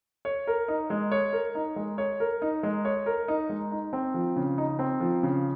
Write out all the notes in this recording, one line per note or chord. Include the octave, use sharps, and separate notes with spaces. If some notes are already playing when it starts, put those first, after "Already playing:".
C#5
A#4
D#4
G#3
C#5
A#4
D#4
G#3
C#5
A#4
D#4
G#3
C#5
A#4
D#4
G#3
D#4
C4
F3
C#3
D#4
C4
F3
C#3